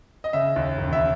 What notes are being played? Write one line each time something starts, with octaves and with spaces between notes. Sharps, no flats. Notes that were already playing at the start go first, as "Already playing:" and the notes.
D#5
C#3 E5
D#2
E1
E5